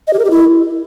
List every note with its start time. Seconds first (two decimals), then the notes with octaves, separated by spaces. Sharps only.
0.08 D#5
0.13 G4
0.19 A#4
0.25 G4
0.31 E4